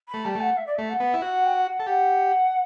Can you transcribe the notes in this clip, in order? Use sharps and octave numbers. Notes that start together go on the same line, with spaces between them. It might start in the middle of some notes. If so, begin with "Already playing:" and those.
B5
A3
G3 A5
A3
F#5
E5
D5
A3 E5
F#5
B3
E4
F#4 F#5
G5
F#5
A4
G4 F#5